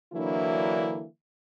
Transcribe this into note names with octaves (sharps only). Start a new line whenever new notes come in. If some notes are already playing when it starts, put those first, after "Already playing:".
D3 E3 F#3 A#3 D4 E4